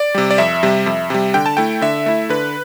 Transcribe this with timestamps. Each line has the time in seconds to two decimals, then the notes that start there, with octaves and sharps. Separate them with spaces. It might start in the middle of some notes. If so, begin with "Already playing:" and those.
Already playing: D5
0.14 C3 G3
0.31 D5
0.38 F2 E5
0.63 C3 G3
0.86 F2
1.10 C3 G3
1.34 D3 G5
1.46 A5
1.57 A3 E4 G5
1.82 D3 E5
2.06 A3 E4
2.29 D3 B4